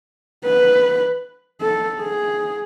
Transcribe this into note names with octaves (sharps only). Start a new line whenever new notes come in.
B4
A4
G#4